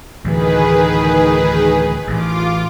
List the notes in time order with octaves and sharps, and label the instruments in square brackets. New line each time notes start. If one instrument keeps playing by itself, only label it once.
[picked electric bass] D2 A2 E3 [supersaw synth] D#3 G#4 B4
[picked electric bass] A1 [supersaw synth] F4 D6